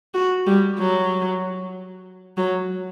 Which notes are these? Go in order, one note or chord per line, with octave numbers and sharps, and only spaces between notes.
F#4
G3
F#3
F#3